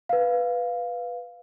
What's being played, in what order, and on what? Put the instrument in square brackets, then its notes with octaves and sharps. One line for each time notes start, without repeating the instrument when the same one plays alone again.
[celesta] B4 F5